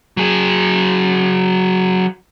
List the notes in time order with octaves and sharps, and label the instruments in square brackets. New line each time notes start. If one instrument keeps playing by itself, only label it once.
[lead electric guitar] F#3 G#4